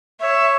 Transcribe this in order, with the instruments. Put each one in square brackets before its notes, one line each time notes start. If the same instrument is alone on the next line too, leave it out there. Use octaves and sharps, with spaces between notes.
[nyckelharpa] C#5 [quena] E5